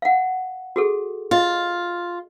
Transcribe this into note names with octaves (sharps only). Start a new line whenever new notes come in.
F5 F#5
F#4 G#4 A4
F4 D#5